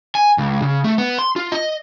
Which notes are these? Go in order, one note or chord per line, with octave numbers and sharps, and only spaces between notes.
G#5
C#2
C#3
A3
B3
C6
F4
D#5